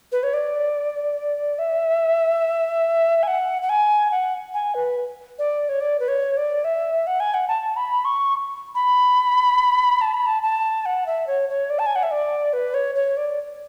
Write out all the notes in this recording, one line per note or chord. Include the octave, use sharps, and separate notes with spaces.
B4
C#5
D5
E5
G#5
F#5
F#5
G#5
F#5
G#5
B4
D5
C#5
D5
B4
C#5
D5
E5
F#5
G#5
F#5
A5
B5
C#6
B5
A5
B5
A5
A5
F#5
E5
C#5
C#5
D5
A5
G#5
F#5
E5
D5
B4
C#5
C#5
D5